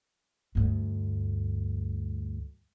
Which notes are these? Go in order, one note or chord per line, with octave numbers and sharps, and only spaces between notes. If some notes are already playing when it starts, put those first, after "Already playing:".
D2 G2